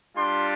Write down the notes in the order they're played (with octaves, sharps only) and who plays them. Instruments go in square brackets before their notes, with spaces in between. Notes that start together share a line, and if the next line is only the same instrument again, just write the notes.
[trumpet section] G3 D4 F4 C6